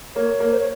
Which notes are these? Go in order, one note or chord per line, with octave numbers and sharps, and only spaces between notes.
A#3 C#5
A#3
C5
C#5